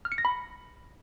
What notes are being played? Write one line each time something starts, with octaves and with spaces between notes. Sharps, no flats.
F6
C#7
A#6
B5